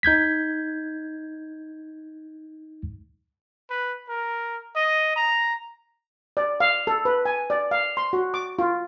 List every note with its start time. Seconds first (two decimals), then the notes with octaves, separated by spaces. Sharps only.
0.03 D#4 G6 G#6 B6
3.70 B4
4.09 A#4
4.76 D#5
5.16 A#5
6.37 D5
6.60 F5
6.87 A4
7.05 B4
7.25 G#5
7.50 D5
7.71 F5
7.97 C6
8.13 F#4
8.34 D6
8.59 F4